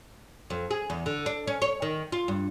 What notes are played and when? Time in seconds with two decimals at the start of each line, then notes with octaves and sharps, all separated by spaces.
0.50 F2
0.71 G#4
0.90 E2
1.06 D3
1.26 D4
1.47 C#4
1.62 C#5
1.82 D#3
2.12 F4
2.28 G2